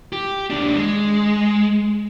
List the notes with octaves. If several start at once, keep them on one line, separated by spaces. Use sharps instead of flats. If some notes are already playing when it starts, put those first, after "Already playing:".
G4
D#2 D4
G#3